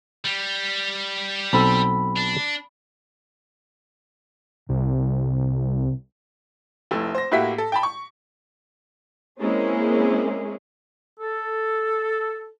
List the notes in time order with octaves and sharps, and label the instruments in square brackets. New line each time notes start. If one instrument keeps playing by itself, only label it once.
[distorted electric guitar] G3
[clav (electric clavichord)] B1 C4 A4 [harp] B5
[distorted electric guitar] D4
[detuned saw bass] C2 [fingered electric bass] C3
[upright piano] F1 A3 E4
C5 A#6
A2 A#3 F#4 G4 E5 B6
A4
G5 A5 B5
C#6
[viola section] G#3 A#3 C4 C#4 E4 G#4
[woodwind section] A4